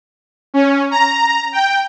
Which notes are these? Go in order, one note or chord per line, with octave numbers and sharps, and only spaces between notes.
C#4
A#5
G5